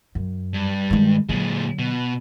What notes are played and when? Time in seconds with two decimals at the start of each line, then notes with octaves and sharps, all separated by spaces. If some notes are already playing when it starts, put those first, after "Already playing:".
0.15 F#2
0.54 G2
0.90 D#3 G#3
1.29 A#2 D3 F#3 G#3
1.79 B2